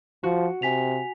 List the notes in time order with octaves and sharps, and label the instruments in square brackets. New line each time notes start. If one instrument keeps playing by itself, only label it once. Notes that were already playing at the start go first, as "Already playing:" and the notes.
[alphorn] F3 [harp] F#4
[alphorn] C3 [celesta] G#5 B6 F7